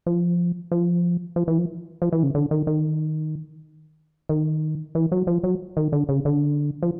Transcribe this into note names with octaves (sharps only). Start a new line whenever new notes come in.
F3
F3
F3
E3
F3
F3
E3
C#3
D3
D#3
D#3
D#3
E3
F#3
F3
F#3
D#3
D3
C#3
D3
F3